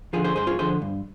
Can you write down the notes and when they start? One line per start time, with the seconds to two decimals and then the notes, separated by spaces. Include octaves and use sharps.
0.13 D3 F3 F4 G#4
0.24 G#4 C5
0.36 G2 G#4 C5
0.47 F4 G#4
0.59 D3 F3 G#4 C5
0.82 G2